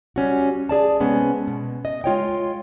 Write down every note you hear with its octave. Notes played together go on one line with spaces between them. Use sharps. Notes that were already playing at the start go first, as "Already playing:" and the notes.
G3 C#4 F#4
G#4 D5 A5
C3 G#3 B3 C#4
B2
D#5
G#3 F4 C#5 G5